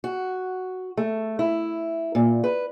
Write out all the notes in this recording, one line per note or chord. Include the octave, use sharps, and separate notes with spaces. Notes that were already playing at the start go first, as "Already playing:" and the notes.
F#4
A3
E4
A#2
B4